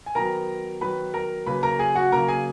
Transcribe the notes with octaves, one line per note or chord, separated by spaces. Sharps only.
G#5
D#3 F#3 B3 A#4 A#5
D#3 F#3 B3 B4 B5
A#4 A#5
C#3 F#3 A#3 B4 B5
A#4 A#5
G#4 G#5
F#4 F#5
C#3 F#3 A#3 A#4 A#5
G#4 G#5